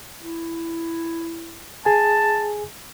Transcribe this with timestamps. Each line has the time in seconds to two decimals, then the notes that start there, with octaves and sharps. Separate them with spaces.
0.18 E4
1.85 G#4 G#5 A5